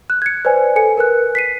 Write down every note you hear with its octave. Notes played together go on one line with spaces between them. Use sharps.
F#6
G#6 C#7
B4 C5 D5 G#5
A4 G#5 C#7
A#4 B4 F#6
B6 C7 D#7